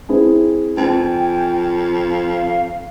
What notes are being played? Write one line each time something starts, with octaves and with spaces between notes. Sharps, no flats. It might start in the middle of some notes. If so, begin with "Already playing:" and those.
C4 E4 G#4
F2 C4 G5 G#5
F5